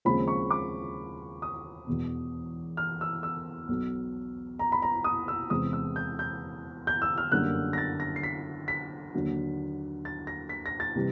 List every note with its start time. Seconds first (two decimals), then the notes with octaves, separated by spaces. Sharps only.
0.05 D#2 C#3 F3 G#3 C4 B5
0.28 C#6
0.51 D6
1.42 D#6
1.87 E1 E2 B2
2.77 F6
3.01 E6
3.23 E6
3.69 B1 B2 F#3
4.59 A#5
4.72 B5
4.82 A#5
5.04 D#6
5.28 E6
5.50 E2 C3 E3 G#3 C4 D#6
5.73 E6
5.96 G6
6.19 G6
6.87 G6
7.02 E6
7.18 F6
7.32 G1 F#2 D3 G3 A#3 F#6
7.73 A#6
7.78 A6
8.00 A#6
8.16 C7
8.23 B6
8.68 B6
9.14 D#2 D3 F#3
10.05 A6
10.27 A#6
10.49 B6
10.66 A#6
10.80 A6
10.95 C3 E3 G3